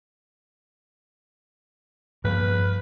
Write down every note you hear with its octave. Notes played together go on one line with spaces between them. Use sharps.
G2 F3 A#3 B4